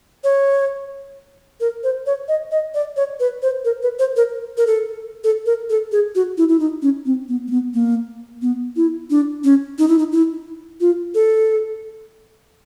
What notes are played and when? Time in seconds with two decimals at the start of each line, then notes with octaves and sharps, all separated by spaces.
0.24 C#5
1.60 A#4
1.84 C5
2.06 C#5
2.28 D#5
2.51 D#5
2.74 D5
2.97 C#5
3.20 B4
3.42 C5
3.65 A#4
3.82 B4
3.99 C5
4.17 A#4
4.57 A#4
4.67 A4
5.24 A4
5.46 A#4
5.70 A4
5.92 G#4
6.15 F#4
6.38 E4
6.49 E4
6.60 D#4
6.82 C#4
7.06 C4
7.29 B3
7.48 A#3
7.51 B3
7.74 A#3
8.42 B3
8.76 E4
9.10 D4
9.44 C#4
9.79 D#4
9.88 E4
9.99 D#4
10.12 E4
10.81 F4
11.15 A4